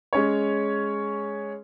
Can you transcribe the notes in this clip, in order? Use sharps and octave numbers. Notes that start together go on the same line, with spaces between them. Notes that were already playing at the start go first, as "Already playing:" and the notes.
G#3 C#4 C#5